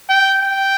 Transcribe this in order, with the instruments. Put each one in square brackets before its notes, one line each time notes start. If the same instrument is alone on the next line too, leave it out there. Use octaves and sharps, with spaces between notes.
[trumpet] G5
G5